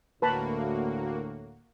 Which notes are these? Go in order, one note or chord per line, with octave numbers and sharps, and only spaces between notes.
D2 A2 A#3 F#4 B4 A5 B5